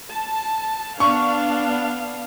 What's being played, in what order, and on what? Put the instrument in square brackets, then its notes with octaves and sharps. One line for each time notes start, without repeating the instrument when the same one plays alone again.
[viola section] A5
[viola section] B3 D4 F5 [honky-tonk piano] C#6